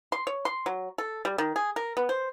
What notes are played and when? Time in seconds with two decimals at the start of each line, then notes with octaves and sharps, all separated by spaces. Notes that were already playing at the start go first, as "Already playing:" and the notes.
0.12 C6
0.27 C#5
0.45 C6
0.66 F#3
0.98 A4
1.25 G3
1.38 D#3
1.56 G#4
1.76 A#4
1.97 B3
2.09 C5